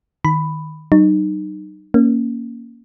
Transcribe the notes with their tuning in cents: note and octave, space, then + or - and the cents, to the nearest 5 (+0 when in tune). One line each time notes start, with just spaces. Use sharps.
D#3 +0 B5 +5
F#3 +45 D#4 -25
A#3 +0 C#4 +0